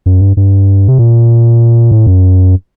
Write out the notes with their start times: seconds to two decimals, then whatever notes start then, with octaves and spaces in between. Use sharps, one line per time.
0.06 F#2
0.21 G2
0.37 G2
0.88 C3
0.98 A#2
1.91 A2
2.07 F#2